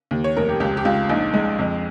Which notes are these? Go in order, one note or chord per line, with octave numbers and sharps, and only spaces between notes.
D#2
C#5
F1 A#4
G4
C#2 G4
G4
C#2 F4
A#1 D#4
G#3
F2